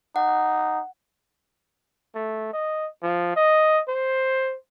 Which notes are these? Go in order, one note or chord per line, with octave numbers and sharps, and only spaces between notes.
D#4 F#5
A3
D#5
F3
D#5
C5